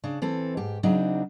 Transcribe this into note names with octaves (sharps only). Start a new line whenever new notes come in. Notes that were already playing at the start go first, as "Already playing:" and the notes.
C#3 D4
E3 C4 A4
G#2 G4
C#3 F#3 C4 D4 D#4